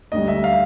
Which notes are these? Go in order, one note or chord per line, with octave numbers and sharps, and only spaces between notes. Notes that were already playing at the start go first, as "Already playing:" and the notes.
D2 D3 G3 D#5
E5
F5